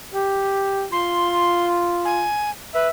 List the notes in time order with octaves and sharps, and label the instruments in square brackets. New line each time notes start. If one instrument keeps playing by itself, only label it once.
[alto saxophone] G4
[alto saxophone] F4 [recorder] C6
[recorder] G#5
[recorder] B4 [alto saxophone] E5